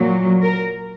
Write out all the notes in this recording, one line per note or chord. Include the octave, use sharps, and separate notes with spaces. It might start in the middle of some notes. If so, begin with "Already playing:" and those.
Already playing: A#2 F#3
A#4